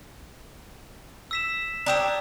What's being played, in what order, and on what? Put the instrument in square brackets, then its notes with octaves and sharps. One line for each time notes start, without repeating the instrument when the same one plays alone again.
[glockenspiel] E6 B6 E7
[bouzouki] D4 G4 C#5 [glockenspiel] A#5 D#6 E6